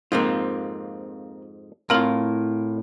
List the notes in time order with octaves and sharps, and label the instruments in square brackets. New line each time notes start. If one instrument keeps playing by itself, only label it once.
[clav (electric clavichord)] F2 G#2 [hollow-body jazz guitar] A#3 C4 F4
[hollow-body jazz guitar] A2 F5 [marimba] C4 E4 [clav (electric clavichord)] F4 A#4